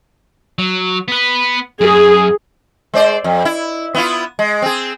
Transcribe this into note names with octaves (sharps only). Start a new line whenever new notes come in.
F#3
B3 B4
F#2 G#4
G#3 C5 D5
F2
E4
B3 E4 F4
G#3
C4 G#4